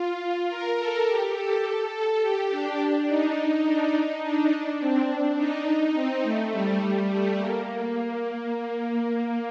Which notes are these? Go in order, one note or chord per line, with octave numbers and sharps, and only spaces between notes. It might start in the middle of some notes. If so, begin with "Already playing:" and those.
Already playing: F4
A#4
A4
G4
A4
A4
A4
G4
D4
D#4
D4
D#4
D4
C4
D4
D#4
C4
A3
G3
A3
A#3